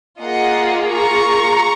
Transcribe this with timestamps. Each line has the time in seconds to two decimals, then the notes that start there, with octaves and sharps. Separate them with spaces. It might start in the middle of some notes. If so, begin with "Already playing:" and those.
0.22 A#3 F4 G#4 D#5 F#5
0.92 A#5 C#6